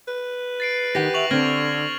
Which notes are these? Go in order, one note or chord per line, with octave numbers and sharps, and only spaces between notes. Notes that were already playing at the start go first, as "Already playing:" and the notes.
B4
A6 C7 D7
D#3 G4 F#5 G5 A#6
E5 C#6 F7 F#7
D3 C4 F6 G#6 A#6